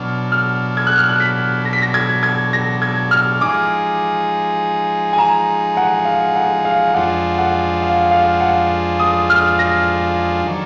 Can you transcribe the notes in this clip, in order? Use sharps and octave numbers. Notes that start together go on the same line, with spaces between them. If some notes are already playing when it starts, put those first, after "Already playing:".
Already playing: B2 F#3 D4 F6
F6
G#6
F#6
F6
F#6
B6
A#6
B6
A#6
G#6
G#6
A#6
G#6
F6
F3 G#3 D#4 G#4 D6
G#5
A#5
F#5
F5
F#5
F5
F2 F3 G#3 D4 F4 F#5
F#5
F5
F5
F#5
D#6
F6
A#6
D#3 F#3 D4